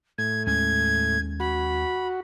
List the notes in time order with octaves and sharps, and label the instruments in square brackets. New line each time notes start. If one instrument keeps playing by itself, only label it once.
[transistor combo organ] A2 [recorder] G#6
[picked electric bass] D#2 G#3 C#4 [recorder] G#6
[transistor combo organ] F#4 [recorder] B5